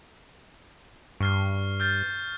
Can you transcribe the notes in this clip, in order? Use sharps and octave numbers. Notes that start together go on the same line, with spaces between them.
G2 C#6 F6 C7
F6 G6 A6